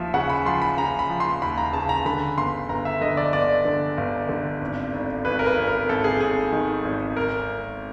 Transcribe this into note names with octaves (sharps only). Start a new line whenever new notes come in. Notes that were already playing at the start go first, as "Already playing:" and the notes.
Already playing: D#2 F3 E5
C#3 F#5
B5
F3 C6
B5
C#3 A#5
B5
F3
C6
D#2 B5
A#5
C#3 A5
A#5
D3 B5
G1 C6
G1 A#5
E5
D3 D#5
D5
G1 D5
D3
G1
D3
G#1
G#1
G#1 B4
A#4
B4
G#1
A#4
G#1 A4
G#4
G#1 G#4
D#3
G#1
A#4